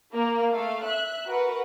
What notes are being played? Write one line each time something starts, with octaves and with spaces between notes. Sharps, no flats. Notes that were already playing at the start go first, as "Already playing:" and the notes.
A#3
A3 F5
E5 F#6
F#4 A#4 B4 F#5